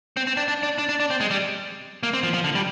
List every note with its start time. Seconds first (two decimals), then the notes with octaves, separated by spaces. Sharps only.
0.17 C4
0.27 C4
0.37 D4
0.48 D4
0.63 D4
0.78 D4
0.89 D4
1.00 D4
1.10 C4
1.20 G#3
1.31 G3
2.03 A#3
2.13 C4
2.23 F3
2.34 F3
2.44 D3
2.55 G3